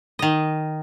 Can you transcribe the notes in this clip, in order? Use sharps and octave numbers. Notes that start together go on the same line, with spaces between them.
D#3 D#5